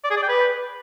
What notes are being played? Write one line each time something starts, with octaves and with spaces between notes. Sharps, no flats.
D5
G#4
D5
G5
B4